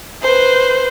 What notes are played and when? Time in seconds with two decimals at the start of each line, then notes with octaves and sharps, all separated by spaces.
0.23 B4 C5